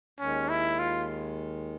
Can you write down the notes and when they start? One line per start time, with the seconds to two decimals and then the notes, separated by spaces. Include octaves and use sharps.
0.19 D#2 D#3 G#3 C#4
0.49 E4
0.79 F4